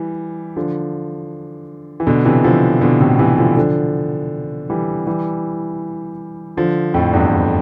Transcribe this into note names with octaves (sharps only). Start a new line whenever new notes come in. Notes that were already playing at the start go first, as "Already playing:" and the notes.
Already playing: E3 G3
D3 F3
E3
B2 D3
C3 E3
D3 F3
B2 D3
A2 C3
C3 E3
D3 F3
D3 F3
E3 G3
E3 G3
D3 F3
F2 A2
E2 G2
F2